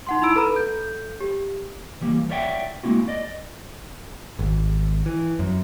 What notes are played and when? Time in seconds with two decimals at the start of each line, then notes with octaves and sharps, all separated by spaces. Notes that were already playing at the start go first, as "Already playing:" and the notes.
0.07 D#4 F#5 C6
0.22 D#4 E4 B5 E6 D7
0.36 A4 B4 A#5 B5
0.52 A4 G6
1.21 G4
2.01 E3 G3 A#3
2.30 A#4 C#5 D5 E5 F#5 G5
2.83 G#3 A#3 C4 E4 F#4
3.08 D5 D#5
4.39 G#1
5.06 E3
5.39 F#2